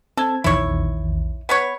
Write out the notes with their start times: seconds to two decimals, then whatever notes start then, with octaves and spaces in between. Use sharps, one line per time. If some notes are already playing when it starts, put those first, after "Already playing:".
0.17 C4 A4 A5 G#6
0.44 A#1 E2 D#3 E4 C#5
1.49 B3 B4 C#5